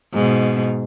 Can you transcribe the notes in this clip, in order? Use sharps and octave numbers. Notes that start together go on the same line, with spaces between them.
G#2 B2